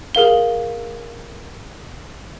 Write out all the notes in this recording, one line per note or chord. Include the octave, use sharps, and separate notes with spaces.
G#4 A#4 F5 G7